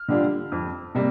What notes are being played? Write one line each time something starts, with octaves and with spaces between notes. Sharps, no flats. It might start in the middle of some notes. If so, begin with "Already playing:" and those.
Already playing: F6
D3 G3 D4 F4
F2
C3 G3 A#3